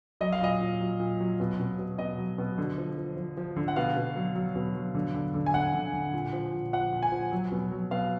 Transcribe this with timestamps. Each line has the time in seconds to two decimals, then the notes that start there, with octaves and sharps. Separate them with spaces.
0.21 F#3 D#5
0.32 F5
0.41 A#2 D#5
0.61 A#2
0.81 F#3
1.00 A#2
1.20 F#3
1.40 B2
1.60 B2
1.79 B2
1.98 B2 D#5
2.18 F#3
2.38 B2
2.58 D3
2.78 F3
2.98 F3
3.17 F3
3.37 F3
3.56 D3
3.68 F#5
3.76 B2 F5
3.96 B2
4.16 F#3
4.35 F#3
4.55 B2
4.75 F#3
4.95 D3
5.14 D3
5.34 D3
5.46 G#5
5.54 D3 F#5
5.75 D3
5.94 D3
6.14 A#2
6.33 F3
6.52 A#2
6.73 F3 F#5
6.92 A#2
7.03 G#5
7.12 F3
7.32 F#3
7.51 B2
7.72 F#3
7.91 B2 F5